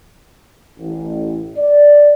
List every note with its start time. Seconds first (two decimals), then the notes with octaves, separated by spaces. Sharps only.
0.79 A1
1.57 D5